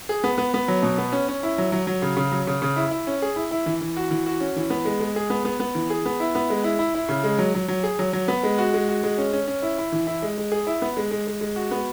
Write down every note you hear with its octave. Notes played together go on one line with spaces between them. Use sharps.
G#4
B3
B3
B3
F#3
B2
B3
C#4
C#4
E4
F#3
F#3
F#3
C#3
C#3
F#3
C#3
C#3
E4
E4
C#4
G#4
E4
E4
E3
E3
F#4
E3
F#4
C#4
E3
B3
G#3
G#3
G#4
B3
B3
B3
E3
G#4
B3
E4
B3
G#3
E4
E4
E4
C#3
G#3
F#3
F#3
F#3
G#4
F#3
F#3
B3
G#3
F#4
G#3
F#4
G#3
C#4
C#4
C#4
E4
E4
E3
E4
G#3
G#3
G#4
E4
B3
G#3
G#3
G#3
G#3
F#4
B3